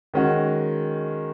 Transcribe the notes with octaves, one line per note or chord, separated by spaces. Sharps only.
D#3 G#3 C#4 F#4